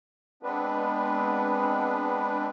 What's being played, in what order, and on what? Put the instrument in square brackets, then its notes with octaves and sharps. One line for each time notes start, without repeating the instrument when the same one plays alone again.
[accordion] G#3 B3 C4 D4 B4